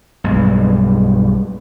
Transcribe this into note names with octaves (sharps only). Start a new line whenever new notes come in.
B1 G2 G#3